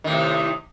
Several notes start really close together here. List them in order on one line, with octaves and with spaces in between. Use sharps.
D#3 A2 C3